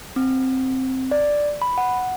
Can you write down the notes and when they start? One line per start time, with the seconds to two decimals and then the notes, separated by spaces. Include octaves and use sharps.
0.16 C4
1.11 D5
1.62 B5
1.78 F#5